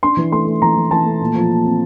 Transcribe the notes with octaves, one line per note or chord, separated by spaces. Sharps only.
D4 C6
E3
A3 C6
A3
E3 A#5
E3
E3 A5
A3
A#2
F3
A#2
C4